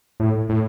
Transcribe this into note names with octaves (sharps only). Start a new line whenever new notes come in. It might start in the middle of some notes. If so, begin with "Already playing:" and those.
A2
A2